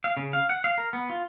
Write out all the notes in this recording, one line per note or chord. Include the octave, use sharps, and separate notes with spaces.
F5
C#3
F5
F#5
F5
A#4
B3
F4